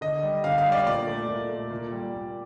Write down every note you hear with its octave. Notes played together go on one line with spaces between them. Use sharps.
D3 D#5
G3
D3 F5
F5
G3
D5
A#2 D5
A3
A#2
A3
A#2
G3
A#2